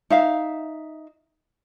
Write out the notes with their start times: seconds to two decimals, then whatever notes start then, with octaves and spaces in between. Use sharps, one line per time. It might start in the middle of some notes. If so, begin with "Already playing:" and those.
0.10 D#4 E5 F5